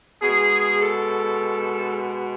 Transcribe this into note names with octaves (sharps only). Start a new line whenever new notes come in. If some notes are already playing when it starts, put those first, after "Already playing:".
B2 G#4
G#3
A4